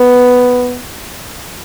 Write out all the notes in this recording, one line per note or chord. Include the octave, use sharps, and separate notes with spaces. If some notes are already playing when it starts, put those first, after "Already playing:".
Already playing: B3